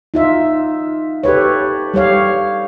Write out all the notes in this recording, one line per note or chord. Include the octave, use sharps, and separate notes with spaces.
D#4 F4 E5
G4 A4 B4 C#5
G3 G4 C#5 F5